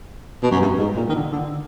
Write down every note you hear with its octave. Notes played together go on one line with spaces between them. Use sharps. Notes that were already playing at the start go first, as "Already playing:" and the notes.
B2
F#2
G2
G#2
A#2
D#3
D3
D3